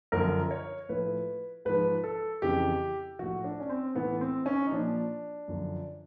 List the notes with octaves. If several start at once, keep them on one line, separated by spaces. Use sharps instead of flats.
F#2 D3 F3 A#4
C#5
A2 F3 B4
G#2 F3 B4
A4
F2 C#3 E3 G4
A2 F3 F#4
D4
C#4
C4
A2 E3 B3
C4
C#4
D#4
A#2 F3 D4
F#2 D3 F3